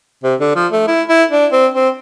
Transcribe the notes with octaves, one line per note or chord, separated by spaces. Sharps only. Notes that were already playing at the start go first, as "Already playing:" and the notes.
C3
D3
F3
A3
E4
E4
D4
C4
C4